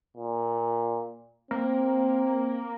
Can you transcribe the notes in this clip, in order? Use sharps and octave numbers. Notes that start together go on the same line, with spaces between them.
A#2
A#3 C4